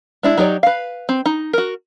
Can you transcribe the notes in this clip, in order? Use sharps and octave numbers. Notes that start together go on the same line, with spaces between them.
G#3 D4 E4
F#3 D#4 G4 C#5 D5
B4 F5
C4
D#4
F#4 A#4